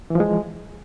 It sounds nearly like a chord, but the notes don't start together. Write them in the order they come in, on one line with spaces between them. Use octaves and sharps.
E3 F3 G#3